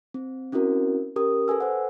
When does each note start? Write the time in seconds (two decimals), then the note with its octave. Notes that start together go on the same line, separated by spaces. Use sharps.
0.14 C4
0.52 C4 C#4 E4 F#4 A#4
1.16 C#4 G4 A#4 D#6
1.48 A4 B4 G#5 E6
1.60 C5 F#5